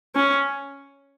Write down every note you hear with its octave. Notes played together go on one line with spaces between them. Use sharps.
C#4